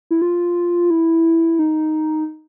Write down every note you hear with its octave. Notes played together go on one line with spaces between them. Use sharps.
E4
F4
E4
D#4